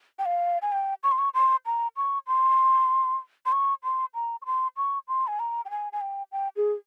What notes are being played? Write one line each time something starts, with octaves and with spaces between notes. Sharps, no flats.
G5
F5
G#5
G5
C#6
C6
C#6
C6
A#5
C#6
C6
C6
C#6
C6
A#5
C#6
C6
C#6
C6
G#5
A#5
G5
G#5
G#5
G5
G5
G#4